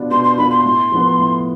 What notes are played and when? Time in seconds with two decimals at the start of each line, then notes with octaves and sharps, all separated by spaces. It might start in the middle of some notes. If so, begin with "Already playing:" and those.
Already playing: B2 B3 D4 F4
0.11 B2 C6
0.24 C6
0.37 B3 D4 F4 B5
0.51 C6
0.64 A2
0.92 F3 B3
1.18 A2